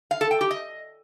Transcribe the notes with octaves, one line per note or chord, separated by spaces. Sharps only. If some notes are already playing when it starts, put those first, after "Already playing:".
F5
A4
G5
G4
D#5